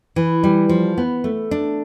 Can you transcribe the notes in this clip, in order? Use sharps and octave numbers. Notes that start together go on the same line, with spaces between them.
E3
G3
F3
B3
A3
D4